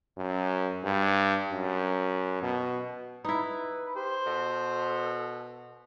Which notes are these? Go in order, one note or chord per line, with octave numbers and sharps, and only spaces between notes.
F#2
G2
F#2
B2
D#4 E4 B4
G4 C5
B2 A4